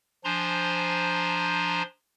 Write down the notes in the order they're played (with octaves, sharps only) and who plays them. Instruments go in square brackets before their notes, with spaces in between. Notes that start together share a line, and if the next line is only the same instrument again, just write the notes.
[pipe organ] F3 D4 C5 G#5 A#5 C6